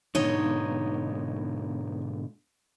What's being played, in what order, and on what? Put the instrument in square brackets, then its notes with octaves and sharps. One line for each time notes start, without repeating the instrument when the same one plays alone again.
[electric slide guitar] G#2 B2 D3 [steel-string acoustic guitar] D#4 C#5 D#5